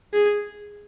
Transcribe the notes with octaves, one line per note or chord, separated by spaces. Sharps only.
G#4